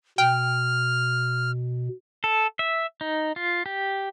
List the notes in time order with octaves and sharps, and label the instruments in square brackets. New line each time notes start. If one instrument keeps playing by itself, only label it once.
[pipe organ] B2 [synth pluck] G5 [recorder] F6
[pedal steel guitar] A4
E5
D#4
F4
G4